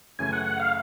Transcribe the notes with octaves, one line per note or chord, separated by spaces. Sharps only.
F#2 C#3 E3 A3 G#5
F#5
F#5
F5